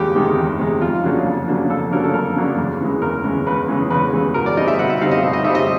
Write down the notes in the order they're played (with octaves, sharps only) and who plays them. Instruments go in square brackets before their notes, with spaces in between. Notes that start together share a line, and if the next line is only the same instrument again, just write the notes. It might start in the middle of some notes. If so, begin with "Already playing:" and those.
Already playing: [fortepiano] E2 D#3 G#3 G4
C3 D#3 G#3
E2
C3 D#3 G#3
F2 F4
C#3 F#3 A#3 D4
F2
C#3 F#3 A#3 D4
F2 A4
C#3 F#3 A#3 D4 A#4
A4
F2 A#4
C#3 F#3 A#3 D4
E2
C#3 E3 G#3
E2 A#4
C#3 E3 G#3
E2 B4
C#3 E3 G#3
E2 B4
C#3 E3 G#3
B2 A#4
D5
G3 C4 D#4 D#5
E5
B2 F#5
E5
G3 C4 D#4 F5
D#5
B2 E5
D#5
G3 C4 D#4 E5
D#5